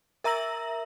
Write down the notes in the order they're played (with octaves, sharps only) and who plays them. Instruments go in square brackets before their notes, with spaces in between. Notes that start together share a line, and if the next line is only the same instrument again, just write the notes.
[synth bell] A#4 E5 A#5 E6 A#6 F#7